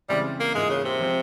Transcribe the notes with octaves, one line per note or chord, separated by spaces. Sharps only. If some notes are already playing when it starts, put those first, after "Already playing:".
C#3 E3 G3 G#3 C4
A#3
G#2 E3 G#3 A#3 F4
C#3
C3
F3 G#3 C4 F4